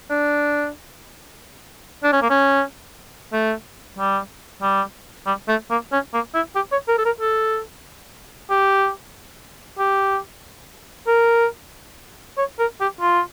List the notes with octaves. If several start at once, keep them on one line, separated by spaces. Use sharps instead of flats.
D4
D4
C#4
A#3
C#4
A3
G3
G3
G3
A3
A#3
C#4
A#3
E4
G4
C#5
A#4
A4
A#4
A4
G4
G4
A#4
C#5
A#4
G4
F4